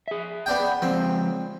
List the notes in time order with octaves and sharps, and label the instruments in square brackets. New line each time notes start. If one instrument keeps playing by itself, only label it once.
[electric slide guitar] G#4 E5
[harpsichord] B3 D4 G5
[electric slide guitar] F3 G#3 [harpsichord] C4